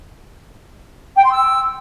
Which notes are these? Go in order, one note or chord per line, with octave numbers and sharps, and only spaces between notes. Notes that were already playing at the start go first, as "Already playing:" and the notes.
G5
C6
E6